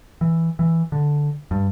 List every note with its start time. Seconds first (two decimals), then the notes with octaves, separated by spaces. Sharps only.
0.21 E3
0.59 E3
0.92 D3
1.51 G2